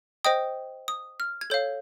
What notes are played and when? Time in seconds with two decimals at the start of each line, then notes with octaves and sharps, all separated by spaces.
0.25 C5 D#5 G5 D#6
0.88 D#6
1.20 F6
1.41 G#6
1.50 A4 C#5 F5 G6